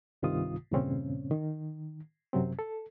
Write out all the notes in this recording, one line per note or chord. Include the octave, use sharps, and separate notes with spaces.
C2 G2 C3 D#3 F4 D#6
E2 G2 A#2 C#3 C4 C#4
D#3
F#2 C3 F#3 C4
A4